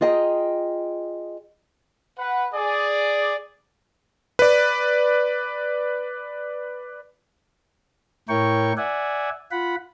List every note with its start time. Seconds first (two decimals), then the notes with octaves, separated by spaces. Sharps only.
0.01 F4 G#4 D#5 G5 G#5 A#5
2.18 B4 F#5
2.54 G#4 D5
4.39 B4 D5
8.29 A2 E4 A#4 C#5 G5 C#6
8.77 D5 E5 F#5 G#5
9.51 F4 F#5 B5